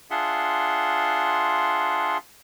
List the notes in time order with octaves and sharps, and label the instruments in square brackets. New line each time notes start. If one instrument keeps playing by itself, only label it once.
[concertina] D4 F4 G#4 E5 F#5 C6